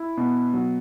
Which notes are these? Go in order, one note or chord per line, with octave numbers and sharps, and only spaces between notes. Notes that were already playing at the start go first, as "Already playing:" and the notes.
Already playing: E4
B2
F#3